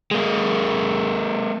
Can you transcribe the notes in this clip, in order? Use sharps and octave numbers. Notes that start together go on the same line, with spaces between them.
G#3 A#3